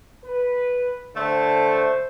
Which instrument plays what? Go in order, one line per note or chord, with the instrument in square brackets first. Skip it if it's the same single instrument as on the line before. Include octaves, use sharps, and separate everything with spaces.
[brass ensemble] B4
[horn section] D3 A3 [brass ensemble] C5